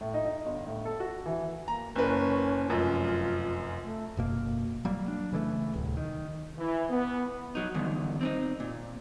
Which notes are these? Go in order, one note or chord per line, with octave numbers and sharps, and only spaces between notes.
A2
D#4
D#4
G1
A2
A4
F#4
E3
A#3 A#5
F#1 C#4 A#4 B4
F1 F#2 F4
A3
F#1 B2 A#3
F#3 G3 A#3
D4
C#3 E3 G#3 A3
D1 C2
D#3
E3
B3
F#3 D#4
E2 G2 D3 D#3
C4 D4 D#4
A#2